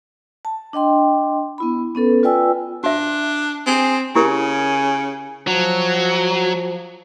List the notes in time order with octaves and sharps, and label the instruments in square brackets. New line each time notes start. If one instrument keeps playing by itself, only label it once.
[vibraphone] A5
D4 D#5 G5 C6
B3 E4 B5
B3 C#4 A4 B4
F4 B4 D5 G5 G#5 E6
[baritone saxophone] D4 [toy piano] F#4 E5
[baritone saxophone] C4 [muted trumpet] G#4
[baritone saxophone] C#3 [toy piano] E4 G4 A#4 [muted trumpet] G#5
[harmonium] F3 [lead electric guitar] F#3